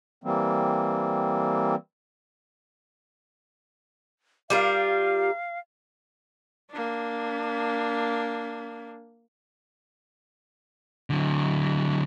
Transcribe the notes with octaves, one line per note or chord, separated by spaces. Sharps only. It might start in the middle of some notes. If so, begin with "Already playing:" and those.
E3 G3 A#3 C4
G3 F4 A#4 F5
A#3 D4
D3 F#3